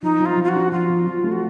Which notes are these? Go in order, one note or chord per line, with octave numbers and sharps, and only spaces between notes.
F3 D#4
F3
F4
F3
F4
F#4
D4
F3 F4
F3
F3
A3
F#4